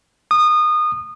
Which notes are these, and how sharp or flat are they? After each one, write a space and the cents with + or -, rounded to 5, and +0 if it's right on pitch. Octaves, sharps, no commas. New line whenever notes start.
D#6 -25